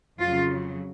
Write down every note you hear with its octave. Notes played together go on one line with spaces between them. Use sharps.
F2 C#3 F#3 F4